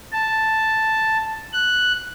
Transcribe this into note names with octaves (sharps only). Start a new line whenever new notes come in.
A5
F#6